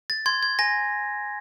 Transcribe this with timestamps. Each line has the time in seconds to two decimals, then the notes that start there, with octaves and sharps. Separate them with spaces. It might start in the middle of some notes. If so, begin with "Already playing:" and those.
0.10 A6
0.26 C6 G#6
0.43 G#6
0.59 G#5 A#6